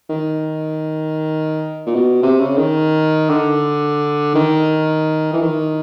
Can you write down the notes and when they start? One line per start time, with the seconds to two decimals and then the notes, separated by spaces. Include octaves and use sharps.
0.09 D#3
1.86 A#2
1.95 B2
2.23 C3
2.40 C#3
2.57 D#3
3.29 D3
4.35 D#3
5.33 E3
5.42 D#3